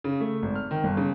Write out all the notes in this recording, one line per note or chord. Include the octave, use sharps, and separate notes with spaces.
C#3
A3
G#1
F6
D#3
G1
C#3